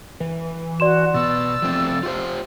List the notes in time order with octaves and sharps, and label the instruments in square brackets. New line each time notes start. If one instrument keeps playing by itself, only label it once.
[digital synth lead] E3
[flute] F#4 [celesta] D5 C6 E7
[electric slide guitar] B2 B3 [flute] E6 [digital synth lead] A6
[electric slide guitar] F3 A3 C4
F4 G4 C5